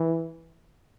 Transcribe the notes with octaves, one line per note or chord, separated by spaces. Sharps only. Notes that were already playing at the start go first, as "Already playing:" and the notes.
Already playing: E3